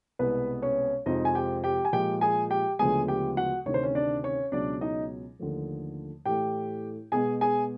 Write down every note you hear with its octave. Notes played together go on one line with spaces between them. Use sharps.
C2 B2 G#3 B3 B4
C#4 C#5
F2 C3 F3 G#3 D#4 D#5
G#5
G4 G5
G4 G5
G#5
A#2 F3 G#3 G4 G5
G#4 G#5
G4 G5
D2 C#3 F3 G#3 B3 G#4 G#5
G4 G5
F#4 F#5
D2 C3 D#3 C#5
C5
C#4 C#5
D4 D5
C#4 C#5
C#2 B2 F#3 D4 D5
D#4 D#5
D#2 D3 F3 A3
A2 E3 A3 G4 G5
B2 G#3 B3 G#4 G#5
G#4 G#5